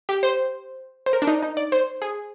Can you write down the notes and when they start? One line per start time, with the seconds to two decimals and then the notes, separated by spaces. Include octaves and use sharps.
0.09 G4
0.23 C5
1.06 C5
1.13 A#4
1.22 D4
1.27 D#4
1.42 D#4
1.57 D5
1.72 C5
2.02 G#4